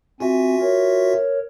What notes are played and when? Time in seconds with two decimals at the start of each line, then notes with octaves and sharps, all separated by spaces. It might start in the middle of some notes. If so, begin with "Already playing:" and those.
0.20 C4 F4 F#4 E5 G#5
0.61 A#4 C#5